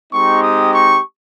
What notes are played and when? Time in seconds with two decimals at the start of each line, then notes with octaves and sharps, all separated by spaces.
0.13 G#3 C4 D#4 G4 C#6
0.43 D#6
0.74 C#6